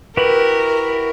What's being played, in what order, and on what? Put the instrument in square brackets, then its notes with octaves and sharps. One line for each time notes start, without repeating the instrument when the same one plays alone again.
[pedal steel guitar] E4 F#4 G4 [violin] A#4 [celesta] B4 B5 F#7